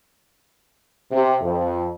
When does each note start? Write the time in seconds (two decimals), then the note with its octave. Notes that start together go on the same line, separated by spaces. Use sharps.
1.12 C3
1.41 F2